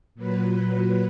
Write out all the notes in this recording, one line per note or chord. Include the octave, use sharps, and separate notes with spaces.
A#2 F#3 B4